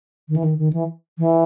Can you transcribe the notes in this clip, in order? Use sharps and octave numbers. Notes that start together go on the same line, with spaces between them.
D#3
E3
D#3
D#3
E3
E3